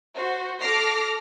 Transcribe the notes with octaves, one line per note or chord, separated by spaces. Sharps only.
F#4 C5
A4 D6 F6 A#6 C7 D7